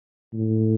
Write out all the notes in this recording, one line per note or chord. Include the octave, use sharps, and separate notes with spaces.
A2